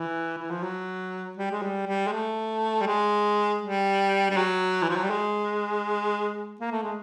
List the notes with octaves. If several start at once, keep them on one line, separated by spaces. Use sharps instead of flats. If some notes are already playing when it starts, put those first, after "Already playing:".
Already playing: E3
E3
F3
F#3
G3
G#3
G3
G3
G#3
A3
G3
G#3
G3
G3
F#3
E3
F3
F#3
G3
G#3
A#3
A3
G#3